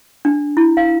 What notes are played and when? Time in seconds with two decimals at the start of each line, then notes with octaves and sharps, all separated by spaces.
0.25 D4
0.57 E4
0.77 F5